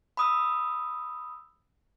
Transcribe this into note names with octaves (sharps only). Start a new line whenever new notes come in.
B5 D#6 E6